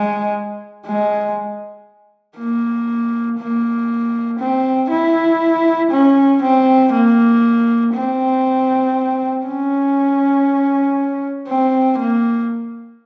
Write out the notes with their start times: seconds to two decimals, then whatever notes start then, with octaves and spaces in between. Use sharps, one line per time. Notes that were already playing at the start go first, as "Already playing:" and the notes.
Already playing: G#3
0.86 G#3
2.38 A#3
3.39 A#3
4.40 C4
4.91 E4
5.91 C#4
6.42 C4
6.93 A#3
7.94 C4
9.46 C#4
11.48 C4
11.98 A#3